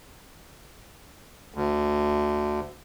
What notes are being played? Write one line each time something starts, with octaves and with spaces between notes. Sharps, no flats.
D2